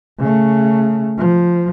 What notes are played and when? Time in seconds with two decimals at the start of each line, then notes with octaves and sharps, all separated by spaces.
0.20 C#3 A3
1.18 F3